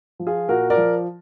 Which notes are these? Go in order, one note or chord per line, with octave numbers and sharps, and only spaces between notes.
F3
F4 G#4
A#2 F#4 A#4
A#4 D5
F3